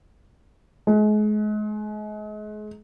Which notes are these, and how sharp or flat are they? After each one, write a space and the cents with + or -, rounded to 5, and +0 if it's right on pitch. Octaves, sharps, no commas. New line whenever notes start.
G#3 +35